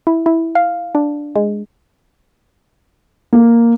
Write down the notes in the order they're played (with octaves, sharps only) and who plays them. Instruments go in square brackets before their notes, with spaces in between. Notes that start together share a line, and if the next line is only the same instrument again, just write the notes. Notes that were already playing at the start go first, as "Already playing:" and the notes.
[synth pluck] E4
E4
F5
D4
G#3
[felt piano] A#3